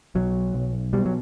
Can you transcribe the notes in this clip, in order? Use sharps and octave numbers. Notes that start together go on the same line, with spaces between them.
B1 F#3
B1
B2 G3
F#3